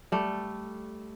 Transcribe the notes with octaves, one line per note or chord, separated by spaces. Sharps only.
G3 A3